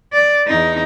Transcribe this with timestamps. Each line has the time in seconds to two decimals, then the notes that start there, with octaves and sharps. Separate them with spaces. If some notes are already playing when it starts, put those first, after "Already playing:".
0.13 D5
0.47 E2 D#4